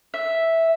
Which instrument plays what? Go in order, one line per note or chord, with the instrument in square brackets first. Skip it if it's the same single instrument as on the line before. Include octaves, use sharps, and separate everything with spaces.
[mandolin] E5